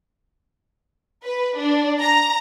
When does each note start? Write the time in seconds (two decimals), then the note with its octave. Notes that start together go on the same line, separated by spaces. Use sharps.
1.24 B4
1.57 D4
2.00 A#5